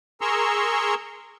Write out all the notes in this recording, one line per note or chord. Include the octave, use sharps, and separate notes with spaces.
G#4 A#4 A#5 C6 C#6 E6